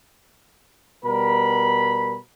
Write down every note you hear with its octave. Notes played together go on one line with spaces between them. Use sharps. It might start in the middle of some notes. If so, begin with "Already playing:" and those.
B2 G3 A#4 B5